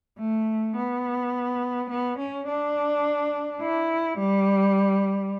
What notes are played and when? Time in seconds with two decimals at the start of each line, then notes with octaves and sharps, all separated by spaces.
0.19 A3
0.77 B3
1.90 B3
2.19 C#4
2.48 D4
3.61 E4
4.19 G3